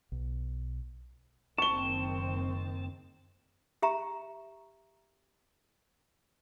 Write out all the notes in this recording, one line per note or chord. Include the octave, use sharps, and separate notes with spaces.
B1
F#1 D#3 C4 A5 C#6 G7
G4 E5 A#5